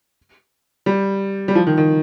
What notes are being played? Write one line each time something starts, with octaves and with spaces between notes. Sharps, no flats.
G3
G3
F3
D#3
D#3